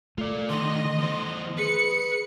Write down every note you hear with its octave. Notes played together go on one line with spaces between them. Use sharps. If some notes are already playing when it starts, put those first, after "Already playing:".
A3 F4 D5
D3 D#3 D#5 C6
E2 C5
G#4 B4 C#7